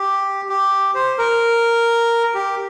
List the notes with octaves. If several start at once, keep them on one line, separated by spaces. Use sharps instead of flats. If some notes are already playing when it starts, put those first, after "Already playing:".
Already playing: G4
G4
C5
A#4
G4